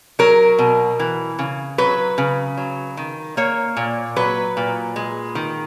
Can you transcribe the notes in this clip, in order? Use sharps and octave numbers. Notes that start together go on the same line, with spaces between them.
F#3 A#4
B2
E3
C#3
F#3 B4
C#3
F#3
D#3
A#3 C#5
A#2
F#3 B4
A#2
G#3
D#3